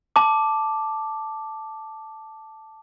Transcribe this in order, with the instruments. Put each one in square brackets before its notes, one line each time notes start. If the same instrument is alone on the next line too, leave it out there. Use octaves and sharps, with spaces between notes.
[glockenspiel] A5 D6